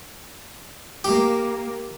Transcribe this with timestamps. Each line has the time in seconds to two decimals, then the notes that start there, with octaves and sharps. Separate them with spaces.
1.04 A#3 G4